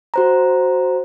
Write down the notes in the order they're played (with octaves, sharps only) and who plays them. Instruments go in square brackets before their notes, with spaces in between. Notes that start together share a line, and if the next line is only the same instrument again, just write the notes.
[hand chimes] F#4 C5 A#5